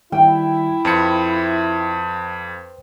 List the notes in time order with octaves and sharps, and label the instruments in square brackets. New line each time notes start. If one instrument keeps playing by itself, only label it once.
[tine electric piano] D#3 G3 [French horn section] E4 [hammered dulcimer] G5
[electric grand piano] F2 C#7 [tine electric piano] B4 C5 D6